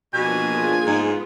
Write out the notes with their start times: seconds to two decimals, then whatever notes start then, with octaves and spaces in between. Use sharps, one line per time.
0.14 B2 F3 A#3 D4 F#4 G#5
0.52 F4 G#4
0.86 G#2 B3